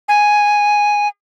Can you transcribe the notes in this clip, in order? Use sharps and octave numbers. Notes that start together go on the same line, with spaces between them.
G#5